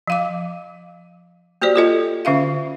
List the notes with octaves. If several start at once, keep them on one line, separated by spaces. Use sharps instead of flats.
F3 F5 D6
A#3 F#4 G4 C5 D5
F4 A4 D#5
D3 C#4 E5 F5